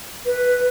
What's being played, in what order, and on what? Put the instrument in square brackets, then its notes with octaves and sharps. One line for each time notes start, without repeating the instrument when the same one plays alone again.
[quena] B4